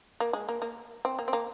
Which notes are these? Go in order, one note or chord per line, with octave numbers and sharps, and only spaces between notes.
A#3
G#3
A#3
A#3
C4
A#3
C4
A#3